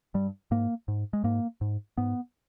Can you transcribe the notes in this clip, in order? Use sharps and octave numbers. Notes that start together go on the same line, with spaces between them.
G2 G3
G#2 A#3
G#2
G#3
G#2 A#3
G#2
G#2 B3